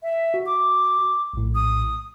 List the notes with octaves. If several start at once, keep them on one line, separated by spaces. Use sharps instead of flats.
E5
F#4
D6
A#1 A2
D#6